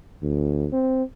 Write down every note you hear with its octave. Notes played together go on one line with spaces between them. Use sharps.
D2
C4